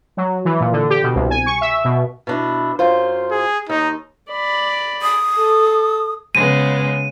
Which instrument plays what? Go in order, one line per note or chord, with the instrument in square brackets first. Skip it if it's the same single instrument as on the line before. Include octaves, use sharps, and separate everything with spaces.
[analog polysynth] F#3
E3
A#2
D3
G4
B2
C2
G#5
C#6
E5
B2
[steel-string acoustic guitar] B2 D4 E4
F#2 F4 C5
[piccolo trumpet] G#4
[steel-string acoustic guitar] D#2 [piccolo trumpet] D#4
[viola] D5 B5
[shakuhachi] D#6
[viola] A4
[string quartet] C#3 G#3 B3 [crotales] D#7